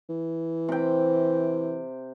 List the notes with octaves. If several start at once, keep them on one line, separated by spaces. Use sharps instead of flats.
E3
C3 G5